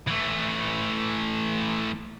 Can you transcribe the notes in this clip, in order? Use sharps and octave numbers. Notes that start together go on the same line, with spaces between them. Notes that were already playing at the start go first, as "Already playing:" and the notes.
E3 A3